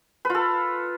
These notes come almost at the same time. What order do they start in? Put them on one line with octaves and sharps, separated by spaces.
B4 F4 A4